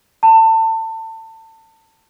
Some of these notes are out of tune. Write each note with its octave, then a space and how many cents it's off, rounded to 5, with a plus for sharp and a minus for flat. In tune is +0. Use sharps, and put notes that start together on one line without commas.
A5 +30